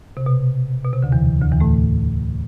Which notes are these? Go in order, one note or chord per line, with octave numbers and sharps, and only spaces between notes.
C3
B2
B2
C3
D2 D3
E2 E3
D2 D3
E2 E3
A2 A3